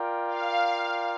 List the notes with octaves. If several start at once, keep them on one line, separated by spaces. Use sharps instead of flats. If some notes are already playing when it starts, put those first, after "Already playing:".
Already playing: F4 A#4 D5 G5
F5